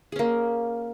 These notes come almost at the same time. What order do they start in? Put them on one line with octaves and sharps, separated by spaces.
G#4 C#4 A#3